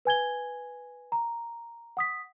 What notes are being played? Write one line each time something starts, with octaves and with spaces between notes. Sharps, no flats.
B4 G#5 G#6 G7
A#5
F#5 D#6 B6